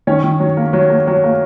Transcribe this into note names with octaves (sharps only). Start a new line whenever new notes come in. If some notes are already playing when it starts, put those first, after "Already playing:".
D#3 C#4 C#5
D#3
F#3
A#3
F#3
A#3
F#3
A#3